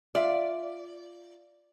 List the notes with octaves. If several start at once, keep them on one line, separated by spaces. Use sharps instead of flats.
F4 D5 E5 F5